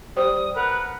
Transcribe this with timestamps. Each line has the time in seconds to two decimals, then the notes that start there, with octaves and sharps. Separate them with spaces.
0.17 G3 C5 D#6
0.56 A#4 B4 F#5